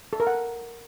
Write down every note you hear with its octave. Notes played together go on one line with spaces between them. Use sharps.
A4
A#4
F#5